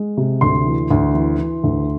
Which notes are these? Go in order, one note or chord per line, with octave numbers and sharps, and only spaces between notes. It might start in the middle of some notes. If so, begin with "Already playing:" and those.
Already playing: G#3
C3
D2 C6
E3
D2
E3
E3
D2